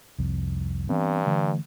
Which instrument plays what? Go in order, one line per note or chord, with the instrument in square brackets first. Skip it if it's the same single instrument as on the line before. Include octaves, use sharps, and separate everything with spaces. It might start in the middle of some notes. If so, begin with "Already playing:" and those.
[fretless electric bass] C2 F2
[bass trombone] G2 [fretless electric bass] E3 B3 C4
[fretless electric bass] D3 E3 A3